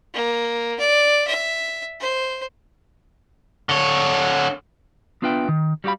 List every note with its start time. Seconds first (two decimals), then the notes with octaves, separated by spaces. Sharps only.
0.14 A#3
0.79 D5
1.27 E5
2.00 C5
3.69 D3 C#5
5.22 B3 D4 F4 B4 E5 G5
5.49 D#3
5.84 G3 F#4 G4 F5 B5